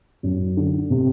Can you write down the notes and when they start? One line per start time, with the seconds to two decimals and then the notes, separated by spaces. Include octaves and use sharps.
0.23 F#2
0.57 D3
0.90 C3